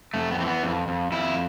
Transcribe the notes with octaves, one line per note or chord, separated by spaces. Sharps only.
F2 A3
B3
E3 C4
B3
F2
F2
F2 E4